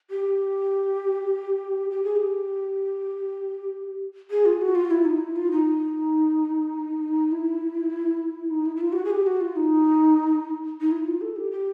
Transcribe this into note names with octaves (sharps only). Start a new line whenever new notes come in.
G4
G4
G#4
G4
G#4
F4
F#4
F4
E4
D#4
E4
F4
D#4
E4
D#4
E4
E4
F4
G4
F#4
G#4
G4
F#4
F4
D#4
D#4
E4
F4
A4
G4
G4